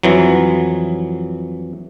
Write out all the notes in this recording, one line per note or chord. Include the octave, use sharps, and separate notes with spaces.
F2 E3 F#3